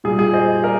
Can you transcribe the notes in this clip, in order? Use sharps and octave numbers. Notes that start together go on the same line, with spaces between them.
A#2 G3 G#4
G#4
C5 D#5
A#4 D5